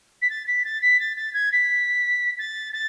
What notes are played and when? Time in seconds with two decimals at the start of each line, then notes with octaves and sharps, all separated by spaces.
0.21 B6
0.30 A6
0.47 B6
0.64 A6
0.81 B6
0.99 A6
1.16 A6
1.33 G#6
1.52 B6
2.38 A6
2.73 A6